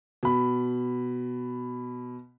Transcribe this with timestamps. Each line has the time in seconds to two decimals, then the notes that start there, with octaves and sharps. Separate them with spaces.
0.23 B2 B5